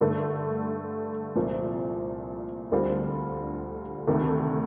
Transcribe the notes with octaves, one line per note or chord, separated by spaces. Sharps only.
G2 D3 A3
C2 A#2 F3 C4
D2 D3 G3 C4 F4
D2 C3 D#3 A3